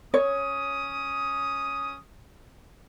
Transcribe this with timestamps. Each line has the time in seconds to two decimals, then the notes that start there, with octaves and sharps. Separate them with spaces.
0.14 C#4 C#5 D#6